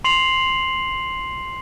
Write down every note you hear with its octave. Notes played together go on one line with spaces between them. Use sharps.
C6 C7 F7 F#7